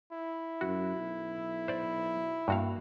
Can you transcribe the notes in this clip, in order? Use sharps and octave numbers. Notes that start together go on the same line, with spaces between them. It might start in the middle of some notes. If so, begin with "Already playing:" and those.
E4
F#2 F#4
B1
C5 D5
G2 A#3 F#4 F5